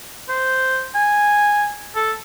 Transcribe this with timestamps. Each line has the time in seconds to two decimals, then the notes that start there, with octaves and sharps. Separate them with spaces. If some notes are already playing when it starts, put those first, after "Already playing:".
0.29 C5
0.95 G#5
1.96 A4